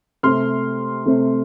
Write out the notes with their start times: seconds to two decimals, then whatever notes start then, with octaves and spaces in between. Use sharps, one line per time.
0.23 C3 A3 C4 C6 F6
1.06 C3 A3 C4